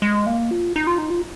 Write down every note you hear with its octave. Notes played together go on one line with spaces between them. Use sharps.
G#3
A#3
F4
D#4
F4
D#4
F4